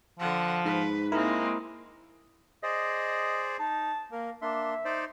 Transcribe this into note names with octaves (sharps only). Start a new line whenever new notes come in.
D3 F3 F#5
G#2 B4
G#3 A#3 C4 E4 A#4
G#4 C5 D5 D#5
D#4 A5
A#3 A#4
A#3 D4 E5 C6
D#4 C5 D5